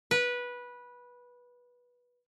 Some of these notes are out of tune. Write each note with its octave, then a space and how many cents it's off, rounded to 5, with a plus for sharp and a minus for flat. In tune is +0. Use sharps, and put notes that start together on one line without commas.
B4 -15